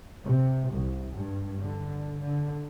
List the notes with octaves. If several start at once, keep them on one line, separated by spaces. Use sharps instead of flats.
C3
C2
G2
D3
D3